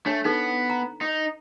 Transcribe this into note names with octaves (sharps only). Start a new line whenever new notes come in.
A3 D4 C#5
B3 D#4 A4 B4
A#5
D#4